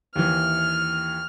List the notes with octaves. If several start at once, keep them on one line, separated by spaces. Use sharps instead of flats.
D#2 E3 F6